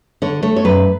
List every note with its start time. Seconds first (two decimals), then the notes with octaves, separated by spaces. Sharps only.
0.22 D3 C#5
0.43 A3 C#5
0.56 C#5
0.65 F#2 B4